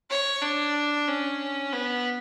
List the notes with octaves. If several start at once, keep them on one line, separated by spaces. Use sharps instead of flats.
C#5
D4
C#4
B3